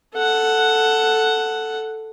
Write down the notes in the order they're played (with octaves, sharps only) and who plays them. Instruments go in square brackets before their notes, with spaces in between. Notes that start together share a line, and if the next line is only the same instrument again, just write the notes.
[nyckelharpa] A4 F#5